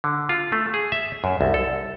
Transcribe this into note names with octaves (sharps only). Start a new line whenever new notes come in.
D3
F4
A3
G#4
E5
F#2
C2
A4